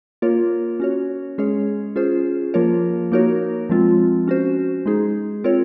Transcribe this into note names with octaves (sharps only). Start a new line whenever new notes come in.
A#3 F4 A#4 C#5
C#4 F#4 C#5
G#3 C#4 G#4 C#5
C#4 F4 G#4 C5
F3 A#3 F4 A#4 C#5
A#3 D#4 F#4 A#4 C#5
F3 G#3 C4 F4
C#4 F#4 C5
G#3 D#4 G#4
C4 F4 A#4 C#5